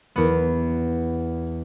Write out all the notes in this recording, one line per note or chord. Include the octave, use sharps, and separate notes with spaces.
E2 B3